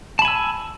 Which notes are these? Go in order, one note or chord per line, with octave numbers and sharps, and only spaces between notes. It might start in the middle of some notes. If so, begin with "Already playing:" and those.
G#5 A5 B5 E6